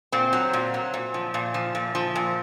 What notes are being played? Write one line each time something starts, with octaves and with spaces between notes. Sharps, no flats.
A#2 C4
F#3
A#2
F#3
A#2
F3
A#2
F3
A#2
F3
A#2